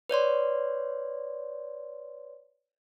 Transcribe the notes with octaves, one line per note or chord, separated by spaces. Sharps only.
B4 C#5 D5 C6